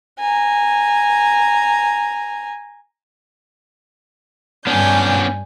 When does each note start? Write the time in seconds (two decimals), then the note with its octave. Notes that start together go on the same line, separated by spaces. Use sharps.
0.19 G#5 A#5
4.67 G2 B3 C#4 D4 G#5 G6